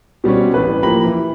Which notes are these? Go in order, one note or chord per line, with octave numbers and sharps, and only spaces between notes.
B2 G3 C4 C#4
A1 B4
F3 A#3 G4 A#5 B5 F#7
E3